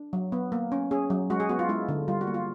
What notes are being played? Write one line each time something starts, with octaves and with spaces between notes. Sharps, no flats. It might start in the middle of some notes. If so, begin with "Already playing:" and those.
Already playing: D4
F#3
B3
A#3
C#4
C#4 G#4
F#3
G#3 F#4
G#4
B3 F#4
F4
G#3 E4
D3
G3 F4
F#4
A#3
F4